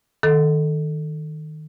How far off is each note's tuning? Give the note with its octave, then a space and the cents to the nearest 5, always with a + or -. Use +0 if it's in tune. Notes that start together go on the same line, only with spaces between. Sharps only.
D#3 -5 A4 +0